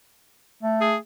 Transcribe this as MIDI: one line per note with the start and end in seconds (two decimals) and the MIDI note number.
0.63 0.96 57
0.81 0.96 68